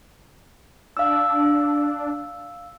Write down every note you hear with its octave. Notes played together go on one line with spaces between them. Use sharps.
D4 F5 E6